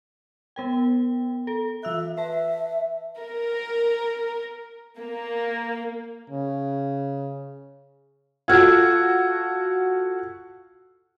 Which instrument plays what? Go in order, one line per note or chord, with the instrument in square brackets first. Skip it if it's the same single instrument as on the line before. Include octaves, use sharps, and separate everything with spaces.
[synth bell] B3 A#4 G5
A4
[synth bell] E3 E6 F#6 [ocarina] E5
[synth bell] B4 A5 [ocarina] E5
[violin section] A#4
A#3
[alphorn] C#3
[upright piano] F4 F#4 A4 [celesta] E6 F6 G#6